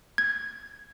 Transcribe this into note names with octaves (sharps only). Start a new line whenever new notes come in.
G#6